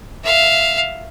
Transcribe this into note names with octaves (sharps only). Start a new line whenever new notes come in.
E5 F5